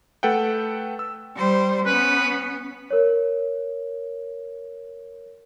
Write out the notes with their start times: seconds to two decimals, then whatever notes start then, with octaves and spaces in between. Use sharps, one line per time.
0.23 A3 A4 B4 F#5 G5
0.99 E6
1.36 G3 C5
1.86 B3 C#4 B4
2.90 A#4 C#5